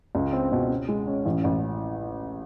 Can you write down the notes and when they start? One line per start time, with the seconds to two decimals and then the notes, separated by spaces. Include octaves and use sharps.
0.15 C#2
0.33 C4
0.52 B2
0.70 C#4
0.89 G#3
1.07 C#4
1.25 A1
1.44 A1